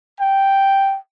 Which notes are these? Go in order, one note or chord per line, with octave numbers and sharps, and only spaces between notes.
G5